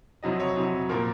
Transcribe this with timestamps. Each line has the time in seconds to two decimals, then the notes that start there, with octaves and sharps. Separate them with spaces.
0.23 F2 C3 F#3 D#5
0.40 C#5
0.56 F2 C3 F#3
0.89 A#2 F3 A#3 A#4